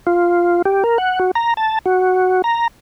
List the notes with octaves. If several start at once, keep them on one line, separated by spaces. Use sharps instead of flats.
F4
G4
A#4
F#5
F#4
A#5
A5
F#4
A#5